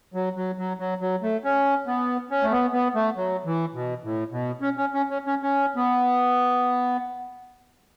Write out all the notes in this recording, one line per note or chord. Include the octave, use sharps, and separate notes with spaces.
F#3
F#3
F#3
F#3
F#3
A3
C#4
B3
C#4
A3
B3
B3
A3
F#3
E3
B2
A2
B2
C#4
C#4
C#4
C#4
C#4
C#4
B3